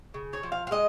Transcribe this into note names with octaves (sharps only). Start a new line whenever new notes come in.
C#3
C#5
F3
F5
F5
G#3 D#5